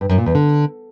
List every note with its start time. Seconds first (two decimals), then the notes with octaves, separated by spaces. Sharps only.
0.01 G2
0.09 F#2
0.18 A#2
0.26 E2
0.35 D3